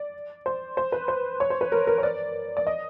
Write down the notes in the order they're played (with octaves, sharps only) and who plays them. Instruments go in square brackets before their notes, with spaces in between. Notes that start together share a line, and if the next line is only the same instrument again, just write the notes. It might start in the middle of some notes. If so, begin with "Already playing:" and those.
Already playing: [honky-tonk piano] D5
C5
C5
B4
C5
C#5
C5
B4
A#4
A#4
C#5
D5
D5
D#5